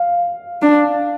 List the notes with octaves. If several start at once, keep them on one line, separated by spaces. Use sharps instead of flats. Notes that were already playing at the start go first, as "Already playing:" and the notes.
Already playing: F5
D4